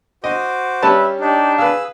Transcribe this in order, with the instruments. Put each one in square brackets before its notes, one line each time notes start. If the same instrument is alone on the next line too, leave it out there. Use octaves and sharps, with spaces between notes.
[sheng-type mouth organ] F#4 C5 D6 [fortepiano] D#5
[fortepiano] G3 C#4 A5 [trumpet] B4 [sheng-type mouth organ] E5
[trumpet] D4 [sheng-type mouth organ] D#4 G4
[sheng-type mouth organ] G#4 E6 [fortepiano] B4 F5